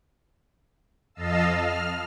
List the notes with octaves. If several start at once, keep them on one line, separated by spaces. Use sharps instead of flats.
F2 D#5 F5 A5 E6
F6